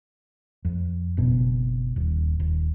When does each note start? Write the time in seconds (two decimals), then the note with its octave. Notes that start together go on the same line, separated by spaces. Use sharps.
0.65 F2
1.17 F#1 B2
1.96 D#1
2.40 D#1